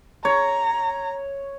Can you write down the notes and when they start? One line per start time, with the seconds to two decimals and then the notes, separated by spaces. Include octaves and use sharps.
0.25 C#5 A#5